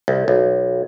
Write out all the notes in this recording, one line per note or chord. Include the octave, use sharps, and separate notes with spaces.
C2
B1